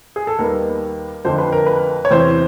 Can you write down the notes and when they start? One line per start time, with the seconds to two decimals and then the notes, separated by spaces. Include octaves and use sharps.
0.16 G#4
0.27 A4
0.39 D#2 D#3 G3 B3 A#4
1.25 F1 F2 D3 F3 C5
1.38 B4
1.52 A#4
1.66 B4
2.05 C#5
2.11 E2 C3 E3 C5